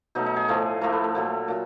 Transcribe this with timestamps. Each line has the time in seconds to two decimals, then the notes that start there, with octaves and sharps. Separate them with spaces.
0.15 B2 F#3 A3 D#4
0.26 D#4
0.36 G#4
0.48 A2 F3 A3
0.81 A2 F3 A3 A#4
0.92 B4
1.04 A#4
1.15 A#2 F#3 A3
1.48 A#2 F#3